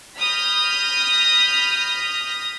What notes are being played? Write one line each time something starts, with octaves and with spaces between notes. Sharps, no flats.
B5 D#6 F6 G6 A#6